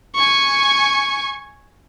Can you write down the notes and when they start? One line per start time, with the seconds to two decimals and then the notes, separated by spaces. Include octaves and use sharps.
0.15 G#5 C#6